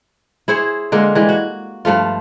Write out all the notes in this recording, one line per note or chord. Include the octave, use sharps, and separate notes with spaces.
E4 G#4 C5 C#5
D3 G#3 A#3 F4
E3 G3 G#3
F#4
G2 F3 A3 F4